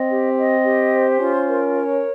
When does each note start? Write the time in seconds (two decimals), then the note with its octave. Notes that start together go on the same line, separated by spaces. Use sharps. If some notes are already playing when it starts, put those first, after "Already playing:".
Already playing: C4 D#5
0.11 G4
0.38 D#5
0.65 G4
0.93 C5
1.19 C#4 F4
1.47 A#4
1.74 C#5